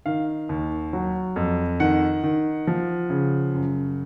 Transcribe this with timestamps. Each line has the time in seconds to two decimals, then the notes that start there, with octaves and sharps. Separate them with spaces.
0.06 D#3 F5
0.49 D#2
0.93 F#3
1.36 F2
1.80 D#3 F#5
2.24 D#3
2.67 F3
3.10 C#3
3.54 F#2